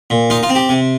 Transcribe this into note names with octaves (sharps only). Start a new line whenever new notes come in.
A#2
D#4 F4
F4
C4
G4
C3